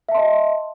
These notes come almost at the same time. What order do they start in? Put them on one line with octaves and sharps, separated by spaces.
E5 A5 C6 D#5